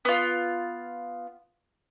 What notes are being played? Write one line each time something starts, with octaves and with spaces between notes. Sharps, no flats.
B3 F4